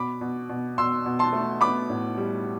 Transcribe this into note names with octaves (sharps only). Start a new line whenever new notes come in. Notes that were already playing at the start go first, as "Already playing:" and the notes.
Already playing: B2 B5 D6
B2
B2
B2 C6 E6
B2
A5 C6
A3
B3 B5 D6
A2
G3